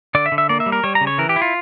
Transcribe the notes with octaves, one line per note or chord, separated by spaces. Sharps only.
D3 D5
E5
D3
E5
A#3 D5
E5
G3
A#4
G3 C#5
A#5
C#3
C#5
E3 A#4
G4
E4
F4